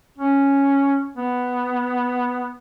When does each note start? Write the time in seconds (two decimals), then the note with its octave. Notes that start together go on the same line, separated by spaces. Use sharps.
0.19 C#4
1.17 B3